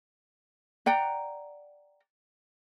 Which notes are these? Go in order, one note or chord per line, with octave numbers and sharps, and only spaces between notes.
D5 F#5 G5 A#5